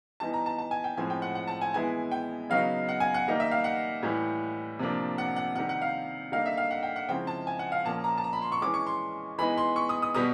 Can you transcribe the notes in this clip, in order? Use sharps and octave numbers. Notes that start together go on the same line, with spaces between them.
E3 G3 B3 D#4 A5
A#5
A5
A5
G#5
G5
A2 F3 G#3 C4 G#5
G5
F#5
F#5
A5
G#5
E3 G#3 B3 E4 G#5
G5
C#3 F#3 B3 D#4 F5
F#5
G#5
F#5
D#3 G3 A#3 D#4
E5
F5
F#5
A2 E3 G3
C3 F3 A#3 D4
F#5
F#5
C3 D#3 G3 F#5
F#5
F5
D3 G3 A#3 D#4 F5
E5
F5
F#5
G5
F#5
C#3 F3 G#3 C4 E4 G5
A5
G#5
F#5
F5
A#2 F3 A#3 C#4 A5
A#5
A5
A#5
B5
C6
C#6
E3 G#3 C#4 D6
C#6
C6
E3 G#3 B3 D#4 B5
C6
C#6
D#6
D#6
B2 G3 B3 D#6